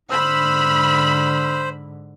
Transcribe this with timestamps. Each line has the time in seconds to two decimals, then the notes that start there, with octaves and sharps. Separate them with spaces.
0.11 G#2 D3 C5 B5 E6 F6